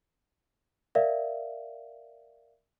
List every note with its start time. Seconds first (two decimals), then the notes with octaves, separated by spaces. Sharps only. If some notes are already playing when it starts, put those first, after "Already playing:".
0.95 A#4 D5 E5 F5